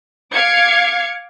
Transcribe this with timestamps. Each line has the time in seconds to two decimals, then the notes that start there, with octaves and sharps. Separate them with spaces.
0.33 F5 D6 G#6 C#7